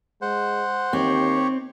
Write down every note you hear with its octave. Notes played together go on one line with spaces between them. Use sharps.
G#3 C5 F#5
D#2 C4 G4 C#5